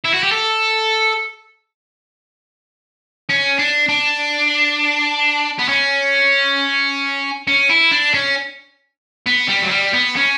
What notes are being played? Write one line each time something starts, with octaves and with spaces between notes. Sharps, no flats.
E4
F#4
G4
A4
C#4
D4
D4
B3
C#4
C#4
E4
D4
C#4
B3
G3
F#3
G3
B3
C#4